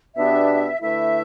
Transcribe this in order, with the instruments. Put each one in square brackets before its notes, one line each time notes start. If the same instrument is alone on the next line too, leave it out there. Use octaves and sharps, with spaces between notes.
[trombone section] B2 B3 D4 G4 [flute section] E5
[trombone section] D3 A3 E4 B4 [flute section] E5